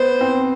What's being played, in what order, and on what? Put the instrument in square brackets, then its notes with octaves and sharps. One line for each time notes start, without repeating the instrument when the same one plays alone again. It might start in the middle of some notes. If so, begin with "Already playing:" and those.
Already playing: [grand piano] B3 [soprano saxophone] C5
[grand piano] C4